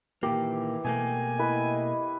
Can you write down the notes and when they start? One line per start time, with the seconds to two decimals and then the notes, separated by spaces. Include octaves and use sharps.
0.23 A#2 D#3 E3 A#3 G4
0.85 B2 A3 A#3 G#5
1.39 E4 B4 D#5